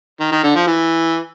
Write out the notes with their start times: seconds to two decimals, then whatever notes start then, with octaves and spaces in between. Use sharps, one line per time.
0.20 D#3
0.32 D#3
0.43 D3
0.55 F3
0.67 E3